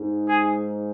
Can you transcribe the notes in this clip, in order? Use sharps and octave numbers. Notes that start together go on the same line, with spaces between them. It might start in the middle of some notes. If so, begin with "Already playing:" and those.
Already playing: G#2 G#3
G#4